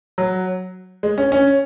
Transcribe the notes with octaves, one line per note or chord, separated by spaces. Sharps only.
F#3
G#3
C#4
C#4